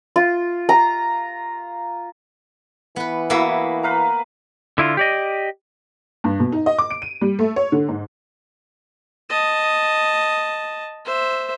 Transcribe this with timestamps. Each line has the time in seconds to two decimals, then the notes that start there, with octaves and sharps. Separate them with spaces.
0.16 F4
0.69 A#5
2.96 E3 B3 B4
3.30 A#3 B3 E4 F#4 E5
3.83 B4 F5 A#5
4.78 D3 E4 F4
4.97 G4 D5 D#5
6.24 G2
6.40 B2
6.52 D#4
6.66 D#5
6.78 D6
6.91 D7
7.02 D#7
7.21 G3
7.39 A3
7.56 C#5
7.72 D3
7.88 G#2
9.29 D#5 A5
11.05 C5 E5